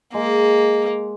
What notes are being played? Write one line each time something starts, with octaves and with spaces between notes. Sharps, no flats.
G#3 A#3